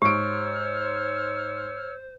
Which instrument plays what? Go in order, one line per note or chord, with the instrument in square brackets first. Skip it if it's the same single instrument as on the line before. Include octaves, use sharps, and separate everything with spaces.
[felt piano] G#2 D7 [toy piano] G4 [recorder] C5 [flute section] C#5 E6 F6